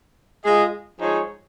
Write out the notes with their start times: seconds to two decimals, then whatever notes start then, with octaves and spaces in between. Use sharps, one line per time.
0.44 G#3 F4 G#4 D#5
1.00 F3 G#3 D#4 G#4 C#5